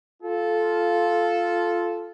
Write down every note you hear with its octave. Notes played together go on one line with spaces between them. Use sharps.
F4 A4